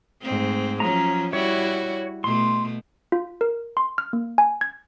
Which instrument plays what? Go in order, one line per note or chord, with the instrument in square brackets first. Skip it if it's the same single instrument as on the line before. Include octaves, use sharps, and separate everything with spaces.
[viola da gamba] G#2 A3 C4
[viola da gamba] F3 F#3 C#4 [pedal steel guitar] A#5
[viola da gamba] G3 E4 F#4 [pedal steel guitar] C#5
[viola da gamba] B2 A3 [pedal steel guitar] C6
[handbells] F4
A#4
C6
F6
A#3
G#5
G#6